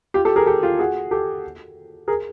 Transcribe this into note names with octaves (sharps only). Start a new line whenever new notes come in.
F4 G4
G4 A4
G#4 A#4
G4 A4
F4 G4
F#4 G#4
G4 A4
G#4 A#4